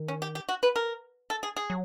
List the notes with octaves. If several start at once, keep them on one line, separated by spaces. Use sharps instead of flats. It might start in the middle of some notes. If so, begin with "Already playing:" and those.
Already playing: D#3
C#4
G4
G4
F#4
B4
A#4
A4
G#4
G#4
F#3